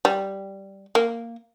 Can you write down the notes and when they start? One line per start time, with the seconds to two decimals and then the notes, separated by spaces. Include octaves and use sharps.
0.05 G3
0.95 A#3